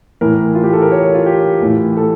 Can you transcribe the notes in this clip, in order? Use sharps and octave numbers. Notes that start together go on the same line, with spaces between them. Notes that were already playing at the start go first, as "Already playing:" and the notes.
A2 E3 A#4
F4
G4
A4
A#4
C#5
F4
G4
A2 E3
A4